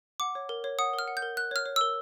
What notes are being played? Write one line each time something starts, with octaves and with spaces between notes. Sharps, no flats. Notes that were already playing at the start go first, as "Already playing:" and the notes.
F#5 D6
C#5
A#4
C#5
F#5 D#6
A#4
F6
F#5
G6
A#4
A#4 F#6
C#5 F6
C#5
A#4 E6